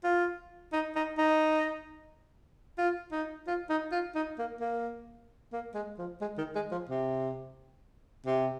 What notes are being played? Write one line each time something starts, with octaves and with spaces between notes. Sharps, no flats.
F4
D#4
D#4
D#4
F4
D#4
F4
D#4
F4
D#4
A#3
A#3
A#3
G#3
F3
G#3
D#3
G#3
F3
C3
C3